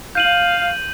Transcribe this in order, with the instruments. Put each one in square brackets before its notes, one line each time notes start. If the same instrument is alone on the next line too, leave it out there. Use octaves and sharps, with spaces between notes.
[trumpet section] F5 [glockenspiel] G6 D#7 F#7